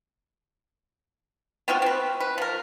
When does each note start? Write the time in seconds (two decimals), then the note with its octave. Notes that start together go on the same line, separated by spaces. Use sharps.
1.68 B3 C4 F4 F#4
1.82 C4 B4
2.20 B4
2.38 F3 A#4